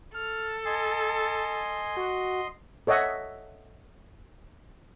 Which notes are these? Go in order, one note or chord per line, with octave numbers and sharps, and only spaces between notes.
A4 F6
D#5 G#5 C6
F#4
A4 C#5 D#5 E5 F#5